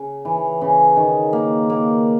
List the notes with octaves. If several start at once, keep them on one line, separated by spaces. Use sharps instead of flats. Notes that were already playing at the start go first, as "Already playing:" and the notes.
Already playing: C#3
E3
C#3
D#3
A#3
A#3